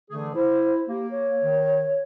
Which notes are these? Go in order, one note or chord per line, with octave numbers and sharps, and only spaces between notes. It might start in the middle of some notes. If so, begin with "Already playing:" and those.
D3 E3 A3 G#4
E4 C5
A#3 G4
C#5
D#3